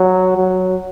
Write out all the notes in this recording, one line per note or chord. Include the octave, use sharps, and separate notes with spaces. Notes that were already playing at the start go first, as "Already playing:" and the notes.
Already playing: F#3
F#3